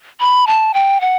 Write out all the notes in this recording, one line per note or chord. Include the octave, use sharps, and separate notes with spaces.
B5
A5
G5
F#5